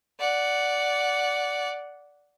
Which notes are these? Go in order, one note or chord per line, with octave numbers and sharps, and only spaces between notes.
D5 F#5